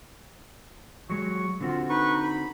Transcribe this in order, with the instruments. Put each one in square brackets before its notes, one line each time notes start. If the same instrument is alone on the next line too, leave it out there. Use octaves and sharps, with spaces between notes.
[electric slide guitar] F#3 G#3 [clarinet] C#6
[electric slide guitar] D3 C4 F#4 [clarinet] F4
[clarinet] D#4 [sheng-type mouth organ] B4 C#6
[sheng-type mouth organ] B5